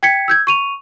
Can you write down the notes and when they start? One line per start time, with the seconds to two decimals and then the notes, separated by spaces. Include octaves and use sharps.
0.03 G5 G#6 B6 C#7
0.28 E6 G6 G#6
0.47 C#6 D#7 F7